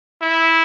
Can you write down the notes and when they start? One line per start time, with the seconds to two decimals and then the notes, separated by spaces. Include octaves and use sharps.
0.22 E4